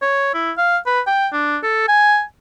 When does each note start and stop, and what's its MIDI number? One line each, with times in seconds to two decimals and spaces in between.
0.02 0.32 73
0.34 0.52 64
0.58 0.78 77
0.86 1.01 71
1.07 1.28 79
1.33 1.57 62
1.63 1.85 69
1.88 2.22 80